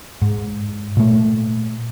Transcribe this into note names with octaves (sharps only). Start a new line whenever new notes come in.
G#2
A#2 A3